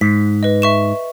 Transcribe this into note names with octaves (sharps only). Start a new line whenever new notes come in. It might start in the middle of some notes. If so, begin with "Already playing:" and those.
G#2 B6
B4 D#5
E5 C#6 E7